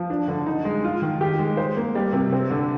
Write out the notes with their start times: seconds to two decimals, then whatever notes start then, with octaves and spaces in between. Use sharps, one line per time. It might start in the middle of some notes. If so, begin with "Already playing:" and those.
Already playing: F3
0.10 D4
0.28 D3
0.46 D#4
0.65 G#3
0.84 F4
1.02 D#3
1.21 G4
1.39 G#3
1.57 C5
1.77 A#3
1.95 G3
2.13 C3
2.32 C4
2.50 D3